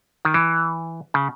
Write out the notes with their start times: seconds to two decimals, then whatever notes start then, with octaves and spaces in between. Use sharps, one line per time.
0.25 D#3
0.34 E3
1.14 C#3